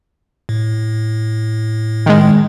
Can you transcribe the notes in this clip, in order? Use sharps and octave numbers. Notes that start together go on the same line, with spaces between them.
A2
D#3 G#3